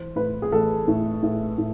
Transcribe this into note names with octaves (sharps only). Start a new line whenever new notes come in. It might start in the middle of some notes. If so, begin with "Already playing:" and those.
Already playing: E3 C5
A2 B4
G#4
A1 A4
A2
A2
A2